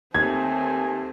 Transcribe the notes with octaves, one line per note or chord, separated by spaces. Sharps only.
D#2 A3 C4 G#5 G#6